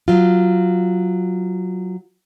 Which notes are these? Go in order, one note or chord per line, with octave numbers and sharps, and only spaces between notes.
F#3 F4